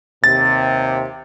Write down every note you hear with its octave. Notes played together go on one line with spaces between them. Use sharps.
D#2 C3 A6